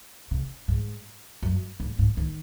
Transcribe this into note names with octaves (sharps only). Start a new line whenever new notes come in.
C#3
G#2
F#2
G#2
G#2
D#3